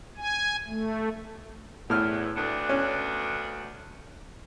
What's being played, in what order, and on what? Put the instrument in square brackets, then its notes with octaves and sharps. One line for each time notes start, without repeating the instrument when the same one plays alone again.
[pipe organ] G#5
A3
[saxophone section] E2 [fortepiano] A2 F6
[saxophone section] D2 B3 D4
[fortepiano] C#4